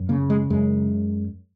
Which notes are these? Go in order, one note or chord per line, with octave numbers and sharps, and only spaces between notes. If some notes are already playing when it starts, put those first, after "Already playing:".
Already playing: F#2
C#3 A#3
G#3
F#2 G#3